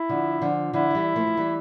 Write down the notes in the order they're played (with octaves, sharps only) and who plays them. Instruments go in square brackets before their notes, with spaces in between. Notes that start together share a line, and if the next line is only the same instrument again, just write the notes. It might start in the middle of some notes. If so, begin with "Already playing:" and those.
Already playing: [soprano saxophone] E4
[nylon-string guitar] D3 F3
D3 F3
[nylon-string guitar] D3 F3 [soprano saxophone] E4
[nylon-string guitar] F3
E3 G3
F3 A3
F3
E3 G3